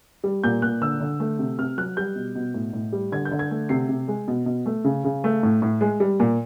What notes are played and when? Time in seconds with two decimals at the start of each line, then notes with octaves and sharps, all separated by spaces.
0.24 G3
0.44 A#2 G6
0.62 A#2 F#6
0.81 D3 E6
1.00 D3
1.20 A3
1.39 C3
1.58 C3 F6
1.78 F#3 F#6
1.97 G3 G6
2.15 B2
2.35 B2
2.54 A2
2.73 A2
2.93 G3
3.12 D3 G#6
3.25 G6
3.32 D3
3.39 G#6
3.51 A3
3.69 C3 C7
3.89 C3
4.08 G#3
4.28 B2
4.46 B2
4.66 A3
4.85 C#3
5.04 C#3
5.24 A3
5.43 A2
5.62 A2
5.81 G#3
6.00 G3
6.20 A#2